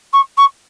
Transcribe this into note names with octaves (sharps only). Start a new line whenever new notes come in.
C#6
C#6